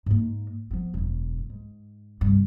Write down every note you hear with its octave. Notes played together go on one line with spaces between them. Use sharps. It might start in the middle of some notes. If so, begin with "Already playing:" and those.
G#2 A#3
F3 B3
E1 F#2
G#2
G2 C3